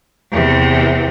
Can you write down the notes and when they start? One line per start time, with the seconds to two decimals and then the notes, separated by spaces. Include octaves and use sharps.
0.32 E2 C3